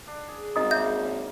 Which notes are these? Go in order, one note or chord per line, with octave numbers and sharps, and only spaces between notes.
D4
G#4
G#1 C#4 F#4 A#4 D#5 D#6
C#3 A#3 D4 E5 G6